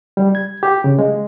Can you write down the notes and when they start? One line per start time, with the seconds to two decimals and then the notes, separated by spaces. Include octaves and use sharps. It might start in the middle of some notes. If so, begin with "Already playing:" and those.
0.17 G3
0.35 G#6
0.63 G4
0.84 C#3
0.99 G#3